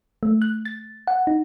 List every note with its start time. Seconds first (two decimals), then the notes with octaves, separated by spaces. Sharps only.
0.23 A3
0.42 F#6
0.65 A6
1.07 F#5
1.27 D#4